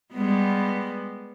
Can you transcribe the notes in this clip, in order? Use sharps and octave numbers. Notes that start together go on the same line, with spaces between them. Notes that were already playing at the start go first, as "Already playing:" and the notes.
G3 G#3 B3